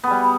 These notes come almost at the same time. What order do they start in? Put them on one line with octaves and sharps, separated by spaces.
B3 G#4 G3